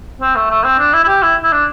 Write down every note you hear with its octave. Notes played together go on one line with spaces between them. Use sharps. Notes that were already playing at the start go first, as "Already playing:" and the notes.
C4
A3
A3
C4
D4
E4
E4
G4
E4
E4
D4